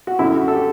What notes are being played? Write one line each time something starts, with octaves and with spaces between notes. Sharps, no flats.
F#4
F#2 D3 E4
F#4
A4
G4